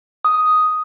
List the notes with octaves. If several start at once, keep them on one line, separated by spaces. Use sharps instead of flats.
D#6